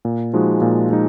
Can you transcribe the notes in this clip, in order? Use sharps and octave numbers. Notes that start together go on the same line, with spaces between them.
A#2
F3 G#3 D#4 F#4
A#2
F3 G#3 D#4